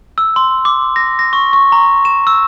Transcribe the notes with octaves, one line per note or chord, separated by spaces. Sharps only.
E6
C6
D6
A#6
A#6
C#6
C#6
A#5
E7
E6